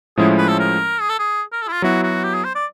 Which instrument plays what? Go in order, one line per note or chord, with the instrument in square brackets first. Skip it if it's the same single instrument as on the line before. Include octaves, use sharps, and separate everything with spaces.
[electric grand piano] A2 F3 G#3 C#4 E4 [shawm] G#4
[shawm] B4
A4
A#4
G#4
A4
G#4
A#4
A4
E4
F4
[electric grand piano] F#3 B3 E4 [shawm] F#4
[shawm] F#4
G4
G#4
C5
D5